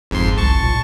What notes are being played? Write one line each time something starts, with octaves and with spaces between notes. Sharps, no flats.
G1 F2 G#2 C6
C2 A5 C#6
A#2